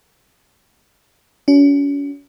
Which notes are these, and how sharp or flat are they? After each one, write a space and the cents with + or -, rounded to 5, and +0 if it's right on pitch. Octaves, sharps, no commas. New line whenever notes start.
C#4 +35 F#4 +15